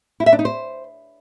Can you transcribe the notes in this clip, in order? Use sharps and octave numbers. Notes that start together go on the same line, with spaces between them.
E4
E5
D4
D#4
C5